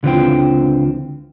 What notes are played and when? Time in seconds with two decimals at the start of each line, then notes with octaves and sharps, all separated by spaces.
0.03 C#2 D3 E3 C4 F4 G5